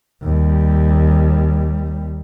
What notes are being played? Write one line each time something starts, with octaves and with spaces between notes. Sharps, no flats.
D#2 G3